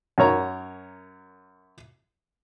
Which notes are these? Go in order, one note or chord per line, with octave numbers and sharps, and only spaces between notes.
F#2 A#4 C#5 A#5